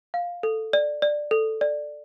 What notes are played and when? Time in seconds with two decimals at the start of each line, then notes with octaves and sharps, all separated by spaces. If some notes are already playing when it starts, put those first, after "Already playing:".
0.14 F5
0.43 A4
0.73 D5
1.02 D5
1.31 A4
1.61 D5